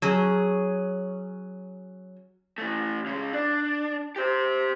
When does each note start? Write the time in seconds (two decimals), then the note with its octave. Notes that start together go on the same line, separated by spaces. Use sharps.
0.02 F#3 C#4 G#4
2.58 E3 A3
3.06 C#3 G#3
3.33 D4
4.16 G4 C5